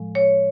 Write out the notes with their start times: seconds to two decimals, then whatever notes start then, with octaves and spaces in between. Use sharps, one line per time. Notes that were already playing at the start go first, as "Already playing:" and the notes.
Already playing: A2 F3 G#3
0.15 C#5